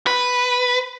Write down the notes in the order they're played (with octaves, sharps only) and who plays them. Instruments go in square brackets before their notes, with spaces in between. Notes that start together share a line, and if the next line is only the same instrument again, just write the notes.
[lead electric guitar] B4